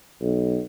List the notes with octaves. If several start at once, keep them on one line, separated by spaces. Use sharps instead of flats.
B1